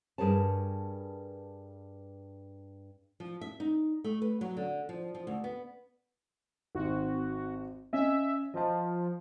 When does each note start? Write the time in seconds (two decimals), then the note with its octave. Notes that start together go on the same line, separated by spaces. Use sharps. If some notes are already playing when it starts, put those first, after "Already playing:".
0.18 G2 G#4 A#4 C#5 A5
3.20 F3
3.41 E5
3.60 D#4
4.04 A3
4.22 B4
4.41 F#3
4.57 D3
4.89 F3
5.15 F3
5.27 D2
5.44 B3
6.75 G#1 C4 F#4
7.93 C#4 D#5 E5
8.54 F3 D#5 A5